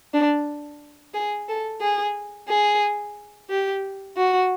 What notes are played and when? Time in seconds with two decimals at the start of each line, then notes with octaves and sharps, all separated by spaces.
0.14 D4
1.14 G#4
1.49 A4
1.81 G#4
2.48 G#4
3.50 G4
4.17 F#4